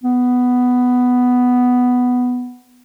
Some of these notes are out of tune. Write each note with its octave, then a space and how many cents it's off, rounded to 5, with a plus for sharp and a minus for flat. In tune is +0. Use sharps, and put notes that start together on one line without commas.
B3 +5